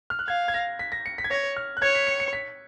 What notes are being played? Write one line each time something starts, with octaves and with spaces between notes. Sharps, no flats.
F6
F#6
F5 G#6
G#6
A#6
B6
A#6
C#7
B6
G#6
C#5 A#6
F6
F#6
C#5 G#6
B6
C#7
C#7
B6